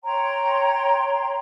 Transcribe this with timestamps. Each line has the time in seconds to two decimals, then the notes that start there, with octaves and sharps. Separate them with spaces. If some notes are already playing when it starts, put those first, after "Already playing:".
0.04 C#5 G5 A#5 C6